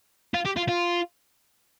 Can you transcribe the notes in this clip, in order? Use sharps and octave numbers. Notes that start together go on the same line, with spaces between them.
F4
G4
F4
F4